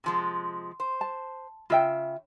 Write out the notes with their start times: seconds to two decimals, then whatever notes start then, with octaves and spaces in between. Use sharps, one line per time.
0.04 C3 F3 G#3
0.80 C5
1.01 A5
1.70 C#3 F4 E5 G5